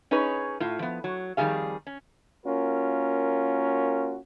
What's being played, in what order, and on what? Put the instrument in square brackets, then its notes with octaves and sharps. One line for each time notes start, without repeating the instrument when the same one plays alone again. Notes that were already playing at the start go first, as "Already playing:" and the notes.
[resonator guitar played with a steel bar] C#4 D#4 G#4 B4 C#5
A2 F4
F3 B3
F#3
F2 D#3 E3 G3 G#4 F5
C#4
[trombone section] A#3 C#4 F4 F#4 A#4